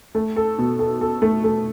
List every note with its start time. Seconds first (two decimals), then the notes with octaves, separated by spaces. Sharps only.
0.15 A3
0.36 A4
0.58 B2
0.79 A4
1.01 A4
1.22 A3
1.44 A3